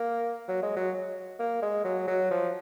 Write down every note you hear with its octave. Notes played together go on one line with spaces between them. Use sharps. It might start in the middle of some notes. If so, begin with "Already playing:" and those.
Already playing: A#3
F#3
G#3
F#3
A#3
G#3
F#3
F#3
F3